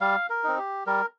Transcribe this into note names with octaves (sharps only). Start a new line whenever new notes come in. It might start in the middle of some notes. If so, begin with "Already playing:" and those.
G3 F5
A#4
C4 D#4
G4
G3 A#4